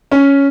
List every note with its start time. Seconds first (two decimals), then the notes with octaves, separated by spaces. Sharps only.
0.12 C#4